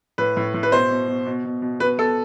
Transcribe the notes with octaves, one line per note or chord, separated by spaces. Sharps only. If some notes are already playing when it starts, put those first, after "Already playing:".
A2 B4
A2
A2
B4
B2 C5
B2
B2
B2
B2
B2
B2 B4
B2 A4